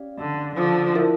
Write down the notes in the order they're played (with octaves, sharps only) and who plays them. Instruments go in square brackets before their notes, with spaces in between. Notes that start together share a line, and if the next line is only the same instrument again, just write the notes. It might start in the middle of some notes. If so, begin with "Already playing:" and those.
Already playing: [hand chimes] C#4 G4 D5 F5
[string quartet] D3
D3 F3
[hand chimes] E4 A#4 E5 A5